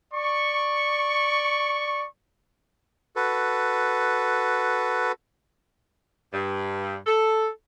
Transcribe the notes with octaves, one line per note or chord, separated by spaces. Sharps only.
D5 C#6
F#4 A4 B4
G2
A4